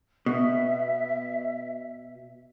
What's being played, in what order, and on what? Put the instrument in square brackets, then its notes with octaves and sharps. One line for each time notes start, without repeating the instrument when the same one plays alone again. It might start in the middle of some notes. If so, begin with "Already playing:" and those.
[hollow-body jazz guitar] B2 [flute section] E5